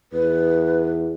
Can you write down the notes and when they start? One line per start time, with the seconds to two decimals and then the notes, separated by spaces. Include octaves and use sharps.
0.13 E2 B4